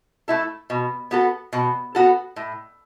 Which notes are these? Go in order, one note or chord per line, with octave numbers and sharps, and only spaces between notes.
A3 E4 A4
B2
B3 F#4 A4
B2
B3 F#4 A4
A2